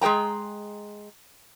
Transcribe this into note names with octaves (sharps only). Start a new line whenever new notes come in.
G#3 G#4 C5 G5 A#5